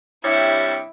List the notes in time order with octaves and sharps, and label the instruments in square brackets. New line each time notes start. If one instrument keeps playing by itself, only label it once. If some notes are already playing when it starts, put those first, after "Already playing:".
[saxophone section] G2 C3 C#5 [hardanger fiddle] E4